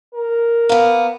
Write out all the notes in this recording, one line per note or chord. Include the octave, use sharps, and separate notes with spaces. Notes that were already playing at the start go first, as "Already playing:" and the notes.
A#4
A#3 B3